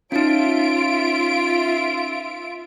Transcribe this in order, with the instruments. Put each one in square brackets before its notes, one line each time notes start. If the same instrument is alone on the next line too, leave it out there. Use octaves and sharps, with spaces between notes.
[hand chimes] C#4 D#4 [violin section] F4 E5 D7